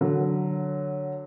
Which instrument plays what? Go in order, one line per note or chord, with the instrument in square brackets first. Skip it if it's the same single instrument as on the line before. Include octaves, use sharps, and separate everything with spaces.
[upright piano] D3 F#3